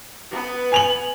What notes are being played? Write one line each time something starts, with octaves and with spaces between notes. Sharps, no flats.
B3 B4
G#5 F7 F#7